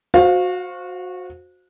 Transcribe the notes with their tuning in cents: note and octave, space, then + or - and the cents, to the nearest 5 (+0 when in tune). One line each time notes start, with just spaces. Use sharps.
F#4 -20 C5 +0 F5 +15